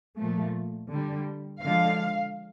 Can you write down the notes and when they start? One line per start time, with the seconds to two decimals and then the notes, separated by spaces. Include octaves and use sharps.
0.18 A#2 F3 A3
0.89 D3 G3
1.62 D3 F3 G#3 F5